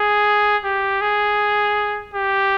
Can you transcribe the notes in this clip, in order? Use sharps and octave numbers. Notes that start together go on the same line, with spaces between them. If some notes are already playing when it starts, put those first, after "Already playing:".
Already playing: G#4
G4
G#4
G4